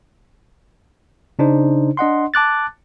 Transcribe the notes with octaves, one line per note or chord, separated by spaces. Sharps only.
C#3 D4 D#4 C5
D4 D#5 F#5 C6
A5 D6 F#6 A6